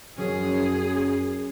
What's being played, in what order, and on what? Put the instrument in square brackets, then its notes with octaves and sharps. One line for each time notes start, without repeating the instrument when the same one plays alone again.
[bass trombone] F#2 [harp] F#3 C#4 [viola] G#4